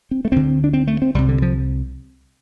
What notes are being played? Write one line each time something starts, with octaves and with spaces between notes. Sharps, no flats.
C4
A3
D2 D3 C4
D4
C4
A3
C4
C2 C3 G3
D3
F3